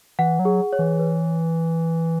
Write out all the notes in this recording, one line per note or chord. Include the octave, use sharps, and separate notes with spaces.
E3 F#5
F#3
G#4
C#5
E3
B4